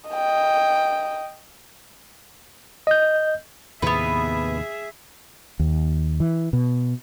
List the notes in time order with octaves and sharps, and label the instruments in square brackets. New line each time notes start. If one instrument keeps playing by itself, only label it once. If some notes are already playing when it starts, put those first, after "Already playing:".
[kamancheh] D#5 G5
[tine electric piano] D#5 G6
[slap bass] D#2 A2 C3 [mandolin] B3 B4 [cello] G#4 E5
[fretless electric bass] D#2
E3
B2